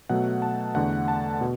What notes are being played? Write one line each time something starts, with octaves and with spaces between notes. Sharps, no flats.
B2 F#3 A3 F#5
A5
E2 D3 A3 F#5
A5
B2